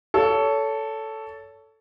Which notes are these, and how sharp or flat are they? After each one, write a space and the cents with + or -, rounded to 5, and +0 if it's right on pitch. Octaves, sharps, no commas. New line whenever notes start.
A4 +0 C#5 +25